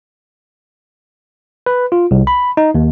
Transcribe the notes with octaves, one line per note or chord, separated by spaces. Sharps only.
B4
F4
C2
B5
D#4
D#2